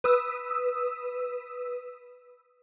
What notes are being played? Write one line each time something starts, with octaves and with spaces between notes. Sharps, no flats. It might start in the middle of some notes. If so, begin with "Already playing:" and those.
B4 D#6 E6